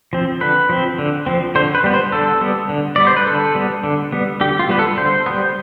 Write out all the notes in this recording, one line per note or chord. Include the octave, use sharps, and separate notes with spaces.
F3 C4
D3 B4
F3 C4
D3
F3 C4
D3 C5
B4
G3 B3
C5
D3 A4
G3 B3
D3
G3 B3 D5
C5
B4
D3 A4
G3 B3
D3
G3 B3
D3 G4
F4
G3 B3 B4
A4
D3 C5
G3 B3